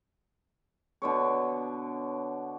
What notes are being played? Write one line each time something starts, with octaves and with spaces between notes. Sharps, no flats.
B2 D3 C#5